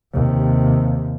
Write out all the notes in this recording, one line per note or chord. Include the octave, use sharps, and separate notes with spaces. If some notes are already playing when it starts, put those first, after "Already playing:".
D#2 C3